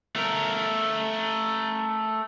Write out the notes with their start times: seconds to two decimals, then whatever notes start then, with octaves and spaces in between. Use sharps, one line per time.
0.16 A3 A#4